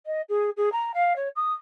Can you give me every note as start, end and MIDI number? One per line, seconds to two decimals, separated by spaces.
0.06 0.21 75
0.29 0.50 68
0.57 0.72 68
0.72 0.92 82
0.94 1.13 77
1.16 1.28 73
1.36 1.52 87